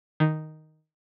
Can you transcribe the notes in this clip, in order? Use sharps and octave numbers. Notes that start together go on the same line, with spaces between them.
D#3